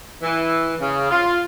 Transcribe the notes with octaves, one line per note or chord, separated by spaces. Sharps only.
E3
C#3
F4